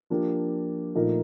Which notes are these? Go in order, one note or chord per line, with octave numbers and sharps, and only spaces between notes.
F3 A#3 D4 G4
A#2 F3 A3 D#4 A#4